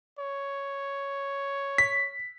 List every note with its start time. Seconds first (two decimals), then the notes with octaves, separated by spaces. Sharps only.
0.19 C#5
1.78 B6